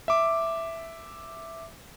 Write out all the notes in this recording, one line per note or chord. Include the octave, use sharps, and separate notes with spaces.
E5 D6